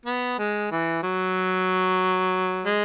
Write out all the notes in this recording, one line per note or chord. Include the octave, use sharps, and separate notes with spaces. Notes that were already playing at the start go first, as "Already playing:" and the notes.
B3
G#3
E3
F#3
G#3